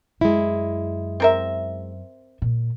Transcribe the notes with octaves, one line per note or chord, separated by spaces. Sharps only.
F#2 G#3 E4
C4 A#4 E5
A#2